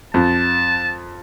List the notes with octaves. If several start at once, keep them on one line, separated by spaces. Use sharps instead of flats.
F2 A5